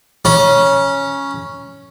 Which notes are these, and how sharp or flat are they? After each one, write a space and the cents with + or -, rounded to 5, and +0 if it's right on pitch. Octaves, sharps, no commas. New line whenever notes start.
C#4 +0 A#5 +45